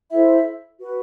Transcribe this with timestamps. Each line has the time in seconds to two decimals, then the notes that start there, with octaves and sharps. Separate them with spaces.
0.10 E4 A4 C5 E5
0.79 F#4 B4